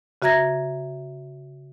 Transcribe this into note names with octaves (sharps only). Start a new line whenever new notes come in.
C#3 F#4 E5 A#5 G#6 A#6